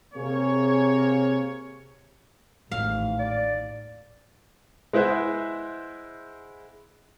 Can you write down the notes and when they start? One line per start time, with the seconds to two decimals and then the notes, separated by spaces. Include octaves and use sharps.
0.14 C3 A#3 G#4 C#5
2.71 A1 D#2 G#2 F5
3.19 D5
4.93 G#3 E4 B4 C5 E5 F#5